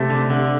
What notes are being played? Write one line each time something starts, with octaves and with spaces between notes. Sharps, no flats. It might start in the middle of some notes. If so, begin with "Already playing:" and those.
Already playing: C3 A3
D3
D3